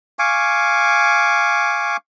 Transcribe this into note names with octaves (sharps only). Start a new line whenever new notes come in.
F5 G#5 C#6 D6